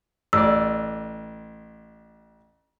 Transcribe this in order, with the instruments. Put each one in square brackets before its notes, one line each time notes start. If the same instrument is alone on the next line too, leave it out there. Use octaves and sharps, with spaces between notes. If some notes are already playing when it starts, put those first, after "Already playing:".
[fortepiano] A1 D5 [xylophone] E6